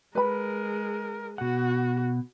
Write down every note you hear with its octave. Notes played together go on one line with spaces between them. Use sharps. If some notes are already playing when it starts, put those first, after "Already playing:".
G#3 A#4 B4 B5
B2 F#4 F#5